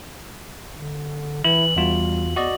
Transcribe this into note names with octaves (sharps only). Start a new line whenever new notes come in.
D3
E3 E4 F#7
E2 G3 F4 F#4
E2 F#4 D5 D#5